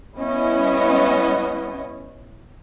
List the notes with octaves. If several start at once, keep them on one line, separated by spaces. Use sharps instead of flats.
G3 B3 C#4 E4 D#5